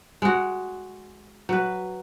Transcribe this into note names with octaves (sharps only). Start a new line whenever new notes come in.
G#3 F#4
F#3 B4